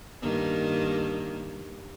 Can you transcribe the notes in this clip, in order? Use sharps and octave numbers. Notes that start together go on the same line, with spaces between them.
G2 D#3 A#3